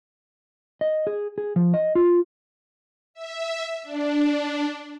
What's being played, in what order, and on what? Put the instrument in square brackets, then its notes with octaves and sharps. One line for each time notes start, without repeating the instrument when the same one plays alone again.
[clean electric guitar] D#5
G#4
G#4
F3
D#5
F4
[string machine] E5
D4